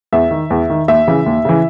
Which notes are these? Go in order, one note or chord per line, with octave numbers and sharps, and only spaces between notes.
E2 E5
D#3
E2
D#3
D#2 E5
C#3 E3
D#2
C#3 E3